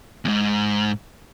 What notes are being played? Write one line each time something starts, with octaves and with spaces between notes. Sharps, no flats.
E2 G#2